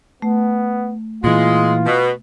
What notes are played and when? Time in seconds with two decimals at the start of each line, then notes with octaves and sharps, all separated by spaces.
0.22 A3 B3
1.24 A#2 E3 G#3 F4
1.86 B2